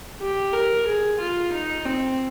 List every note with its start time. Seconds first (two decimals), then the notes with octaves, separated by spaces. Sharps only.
0.21 G4
0.53 A#4
0.87 G#4
1.19 F4
1.52 D#4
1.85 C4